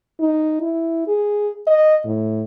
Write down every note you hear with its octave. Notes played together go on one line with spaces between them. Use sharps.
D#4
E4
G#4
D#5
A2